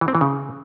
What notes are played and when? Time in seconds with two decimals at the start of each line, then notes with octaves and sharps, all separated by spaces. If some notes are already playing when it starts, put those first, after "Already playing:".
0.01 E3
0.08 C4
0.15 E3
0.21 C#3